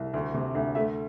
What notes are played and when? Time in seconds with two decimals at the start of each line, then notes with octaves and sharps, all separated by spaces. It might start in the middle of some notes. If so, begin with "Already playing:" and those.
Already playing: C2
0.14 D2
0.34 C3
0.55 D2
0.75 A3 E5